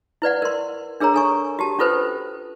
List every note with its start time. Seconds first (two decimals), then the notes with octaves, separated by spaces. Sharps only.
0.22 E4 B4 D5 F#5
0.42 A#4 C6
1.00 D4 G#4 A#4 C#5 A#5
1.14 A4 G#5 C#6
1.59 F#4 G4 A5
1.79 C#4 F4 A4 B4 C5